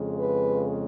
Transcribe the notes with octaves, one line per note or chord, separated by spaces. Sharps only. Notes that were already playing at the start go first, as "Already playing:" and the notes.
Already playing: F2 C#3 G#3
B4